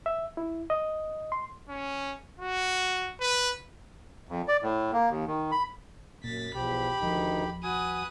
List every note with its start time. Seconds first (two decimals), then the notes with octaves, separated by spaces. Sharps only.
0.06 E5
0.37 E4
0.70 D#5
1.32 C6
1.69 C#4
2.39 F#4
3.20 B4
4.29 F2
4.48 D5
4.63 A2
4.93 A#3
5.10 D#2
5.27 D#3
5.52 B5
6.24 F#2 A#2 A6 B6
6.55 B1 E2 F3 G4 B5
7.00 D#1 D2 D#3 F3 D#4
7.63 F#4 B4 G#5 D#6